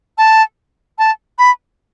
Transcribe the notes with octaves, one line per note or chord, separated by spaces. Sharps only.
A5
A5
B5